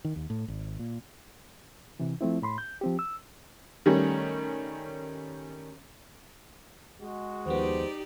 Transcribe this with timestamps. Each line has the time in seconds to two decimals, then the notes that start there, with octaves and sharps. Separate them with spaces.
0.05 D#3
0.16 D#2
0.30 A2
0.48 G#1
0.79 A#2
2.00 C3 E3
2.21 F3 A3 C4 E4
2.42 A2 B5 C6
2.58 G6
2.81 F3 C4 G4
2.99 E6
3.86 D#3 G3 A3 C#4
7.01 G#3 F#4
7.46 D#2 F3 B3 D#4 G4 C5 D5